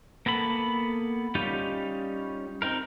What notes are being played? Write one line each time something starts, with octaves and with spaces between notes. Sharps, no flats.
A#3 B3 A4 B5
G3 C#4 D#4 F4 G4
C4 D#4 A#4